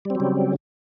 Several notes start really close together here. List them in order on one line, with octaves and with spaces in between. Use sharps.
G3 C4 F#3 C#3